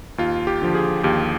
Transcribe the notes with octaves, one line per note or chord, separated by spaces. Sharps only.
D#2 F4
G4
D3 F3
G#4
D#2 G4